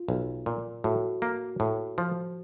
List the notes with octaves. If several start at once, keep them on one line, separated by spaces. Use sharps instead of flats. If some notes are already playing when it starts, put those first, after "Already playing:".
Already playing: F4
B1
A#2
A2 F#4
A#3
A2
F3